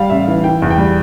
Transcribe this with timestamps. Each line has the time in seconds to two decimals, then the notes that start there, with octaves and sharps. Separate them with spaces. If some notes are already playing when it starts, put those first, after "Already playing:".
Already playing: G3 F5
0.10 A1 E5
0.28 E3
0.44 E3 G5
0.62 E2
0.71 G5
0.78 G3